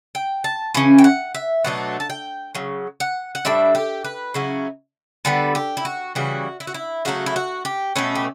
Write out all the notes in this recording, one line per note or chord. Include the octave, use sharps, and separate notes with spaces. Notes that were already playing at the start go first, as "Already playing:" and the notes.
G5
A5
C#3 E3 C#4
G5
F#5
E5
B2 F#3 A3 D4 F#5
A5
G5
C#3 F#3
F#5
F#5
A2 G3 D4 E5
G4
B4
C#3 F#3 C#4 E4
D3 G3 B3 A4
G4
E4
F#4
C#3 E3 G3 F#4
E4
F#4
E4
C#3 F#3 A3 F#4
E4
F#4
G4
B2 A3 C#4 B4
G4